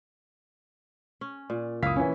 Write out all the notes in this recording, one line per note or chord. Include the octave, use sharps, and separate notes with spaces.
C#4
A#2 D5
C#2 F#2 E4 F5 D#6 B6
E3 C#4